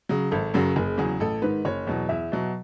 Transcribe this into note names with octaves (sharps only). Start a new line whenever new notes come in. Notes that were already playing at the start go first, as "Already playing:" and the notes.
C#3 F#3
G#1 A4
F#2 C#3 F#3
F#1 G#4
E2 C#3 F#3 G#4
A1 A4
G#2 D#3 B4
F#1 C#5
E2 B2 F#3
E2 E5
B2 F#3